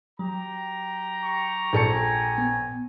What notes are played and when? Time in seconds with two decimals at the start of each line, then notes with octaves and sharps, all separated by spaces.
0.19 F#3 G4 A#5
1.24 C#6
1.73 A#1 A4 G#5 C#7
2.38 B3